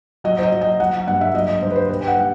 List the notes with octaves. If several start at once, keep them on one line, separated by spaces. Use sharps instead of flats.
F#3 D#5
C5
D#5
F#3
D#5
F#3 F#5
G2 F#5
E5
F#3 D#5
D#5
G2 C5
B4
C5
G3 B4
G5
F#5
G3